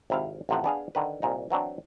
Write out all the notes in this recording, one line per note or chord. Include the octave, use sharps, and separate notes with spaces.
G#1 C3 E4 F5
A1 F2 C3 F3 F#5
B3 D4 G#4 F5
D3 D#3 B4
C2 A#2 D#4
E3 F#3 C4 D4